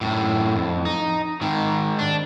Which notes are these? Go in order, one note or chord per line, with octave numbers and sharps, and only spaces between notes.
F#2 A2
F2
D#4
G#2 D#3
D4